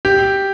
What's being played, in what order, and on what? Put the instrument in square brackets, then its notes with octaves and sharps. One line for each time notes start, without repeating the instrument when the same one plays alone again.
[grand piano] G4